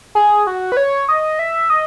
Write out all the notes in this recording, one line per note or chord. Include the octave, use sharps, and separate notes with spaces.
G#4
F#4
B4
C#5
D#5
E5
D#5